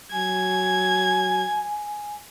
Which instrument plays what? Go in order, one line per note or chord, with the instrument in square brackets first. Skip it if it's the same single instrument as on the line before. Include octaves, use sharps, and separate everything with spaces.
[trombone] F#3 [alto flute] G#5 [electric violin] G#6